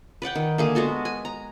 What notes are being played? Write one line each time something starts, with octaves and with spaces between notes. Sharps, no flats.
B4 D5 F#5 G5
D#3
D3 A#3 G#4
G#3 B3 F#4 A4
G#5
A#5